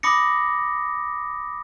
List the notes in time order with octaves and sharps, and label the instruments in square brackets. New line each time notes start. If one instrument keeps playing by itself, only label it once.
[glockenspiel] B5 D6 D#6 A#6 C#7